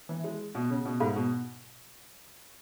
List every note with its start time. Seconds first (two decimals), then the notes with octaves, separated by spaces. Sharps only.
0.09 E3
0.24 G#3
0.55 B2
0.70 C#3
0.85 B2
1.00 G#2
1.16 B2